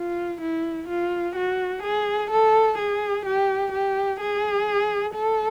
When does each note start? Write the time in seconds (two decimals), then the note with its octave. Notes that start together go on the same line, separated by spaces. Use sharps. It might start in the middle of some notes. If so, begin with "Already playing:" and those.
Already playing: F4
0.41 E4
0.89 F4
1.36 F#4
1.83 G#4
2.31 A4
2.78 G#4
3.26 G4
3.73 G4
4.21 G#4
5.14 A4